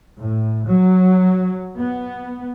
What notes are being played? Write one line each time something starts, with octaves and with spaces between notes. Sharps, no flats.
A2
F#3
B3